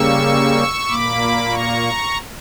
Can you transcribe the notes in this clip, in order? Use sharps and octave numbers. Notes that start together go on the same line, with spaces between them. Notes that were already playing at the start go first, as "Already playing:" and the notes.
Already playing: C#3 G3 A#3 C#6 E6
A#2 A#3 B5 D6
A#5 C#6